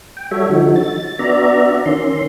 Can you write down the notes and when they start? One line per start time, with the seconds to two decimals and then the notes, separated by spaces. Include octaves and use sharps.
0.17 G5
0.31 G3 F#4 A4 C#5 E5
0.49 D3 F3 D#4 F#4
0.76 A6
1.19 B3 D4 F#4 D5 E5 A#5
1.86 D#3 C#4 C6